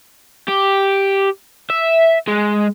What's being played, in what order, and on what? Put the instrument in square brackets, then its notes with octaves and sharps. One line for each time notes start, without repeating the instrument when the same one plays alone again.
[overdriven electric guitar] G4
E5
G#3